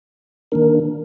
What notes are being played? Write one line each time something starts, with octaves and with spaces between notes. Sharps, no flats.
D#3 A#3 D4 A#4